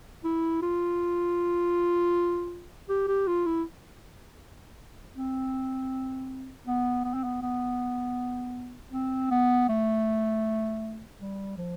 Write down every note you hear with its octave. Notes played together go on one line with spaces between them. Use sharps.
E4
F4
G4
G4
F4
E4
C4
B3
B3
C4
B3
B3
C4
B3
A3
G3
F3